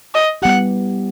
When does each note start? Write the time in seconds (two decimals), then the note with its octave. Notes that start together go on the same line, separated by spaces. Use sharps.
0.15 D#5
0.42 G3 B3 E4 G4 F#5